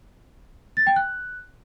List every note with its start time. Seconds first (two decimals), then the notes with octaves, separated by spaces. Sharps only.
0.77 A6
0.87 G5
0.96 F#6